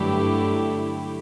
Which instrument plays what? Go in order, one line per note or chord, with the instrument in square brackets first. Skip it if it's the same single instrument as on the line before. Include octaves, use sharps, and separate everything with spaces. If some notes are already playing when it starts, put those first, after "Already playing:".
Already playing: [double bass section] G2 [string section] D3 F#3 A3 E4 G4